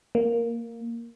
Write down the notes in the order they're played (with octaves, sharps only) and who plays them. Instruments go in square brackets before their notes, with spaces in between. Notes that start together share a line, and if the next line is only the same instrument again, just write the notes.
[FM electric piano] A#3